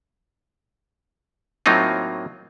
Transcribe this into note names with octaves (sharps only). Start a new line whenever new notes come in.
A2 F#3 A#3 C4 D#4 F4